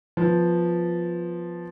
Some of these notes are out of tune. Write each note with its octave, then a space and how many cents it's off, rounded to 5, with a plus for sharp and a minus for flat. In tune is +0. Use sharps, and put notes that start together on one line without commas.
F3 +0 B3 +0